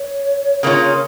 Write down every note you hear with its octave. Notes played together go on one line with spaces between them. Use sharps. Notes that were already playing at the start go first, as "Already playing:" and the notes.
Already playing: C#5
C#3 A#3 C#4 F4